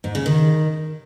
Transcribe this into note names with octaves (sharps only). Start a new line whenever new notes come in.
G#2
C#3
D#3